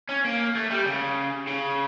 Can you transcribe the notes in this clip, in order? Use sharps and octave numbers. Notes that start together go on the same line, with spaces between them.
C#4
A#3
A3
G3
C#3
C#3